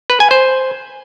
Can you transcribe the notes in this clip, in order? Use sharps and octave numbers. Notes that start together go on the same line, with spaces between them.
B4
G#5
C5